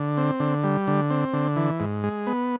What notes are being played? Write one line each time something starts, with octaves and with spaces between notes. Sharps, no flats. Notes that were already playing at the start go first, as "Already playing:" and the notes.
Already playing: D3
C4
D3
G3
D3
C4
D3
E3
G#2
G#3
B3